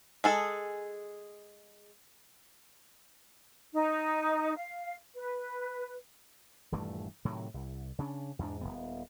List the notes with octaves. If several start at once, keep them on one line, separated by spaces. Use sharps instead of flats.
G#3 G#4 A4
D#4
F5
B4
D#1 G2 E3 A3
A2 C3 D#3 F#3
C2
C#3 C#4 D4
E2 G#2 G#3 D4
D#1 E2 B3